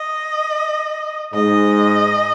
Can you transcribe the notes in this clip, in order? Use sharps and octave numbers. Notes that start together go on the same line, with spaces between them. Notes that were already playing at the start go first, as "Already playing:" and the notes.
Already playing: D#5
G#2 D#5